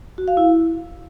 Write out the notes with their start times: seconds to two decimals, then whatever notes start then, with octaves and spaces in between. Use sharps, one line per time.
0.18 F#4
0.28 F5
0.37 E4